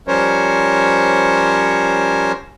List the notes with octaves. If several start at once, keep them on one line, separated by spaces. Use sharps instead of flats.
F3 G3 C#4 A#4 C5 C#5